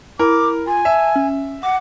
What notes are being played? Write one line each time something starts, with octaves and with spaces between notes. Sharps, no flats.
E4 A#4 D6
F4 G#5
E5 A5
C#4
F#5 D6